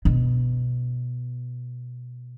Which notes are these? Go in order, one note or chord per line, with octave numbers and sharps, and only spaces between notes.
B2